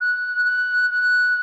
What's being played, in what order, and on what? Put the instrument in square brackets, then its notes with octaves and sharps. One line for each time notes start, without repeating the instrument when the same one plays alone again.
[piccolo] F#6
F#6
F#6